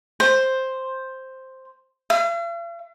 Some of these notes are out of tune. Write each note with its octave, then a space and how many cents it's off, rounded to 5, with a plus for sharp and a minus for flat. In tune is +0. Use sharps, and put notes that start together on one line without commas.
C5 +5
F5 -45